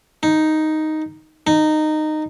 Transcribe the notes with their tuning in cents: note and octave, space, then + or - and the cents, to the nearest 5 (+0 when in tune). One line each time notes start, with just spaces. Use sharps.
D#4 +0
D#4 -15